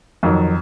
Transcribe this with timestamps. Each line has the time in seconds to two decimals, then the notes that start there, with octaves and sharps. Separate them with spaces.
0.23 F2 D#3 F#3